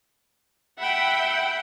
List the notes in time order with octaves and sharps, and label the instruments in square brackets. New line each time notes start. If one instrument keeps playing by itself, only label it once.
[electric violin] E5 B5 [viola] F#5 G5